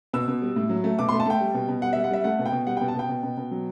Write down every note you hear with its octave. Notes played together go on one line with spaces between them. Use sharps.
B2 E6
B2
G3
A2
F#3
A3
B2 D6
C6
A3
A5
A3 G5
G3
B2
B2
G3 F#5
E5
G3
F#5
G3 E5
A3 F#5
B2
G5
B2
G3 F#5
G5
B2
A5
B2 G5
B2
B2
B2
F#3